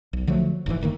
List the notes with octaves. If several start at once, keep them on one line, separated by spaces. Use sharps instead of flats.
B1
D3 F3 F#3 A3
F1 G#2 C3 E3
D3 D#3 G#3 A#3